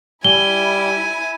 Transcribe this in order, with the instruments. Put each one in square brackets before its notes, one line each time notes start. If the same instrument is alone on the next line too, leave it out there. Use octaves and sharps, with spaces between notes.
[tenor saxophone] G3 [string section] E4 [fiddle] G#5 [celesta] G7